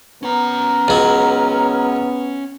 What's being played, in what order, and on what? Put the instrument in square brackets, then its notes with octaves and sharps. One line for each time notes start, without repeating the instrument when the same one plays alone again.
[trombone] B3 [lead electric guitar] C#4 A#5 [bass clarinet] A#4
[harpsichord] C#2 F#3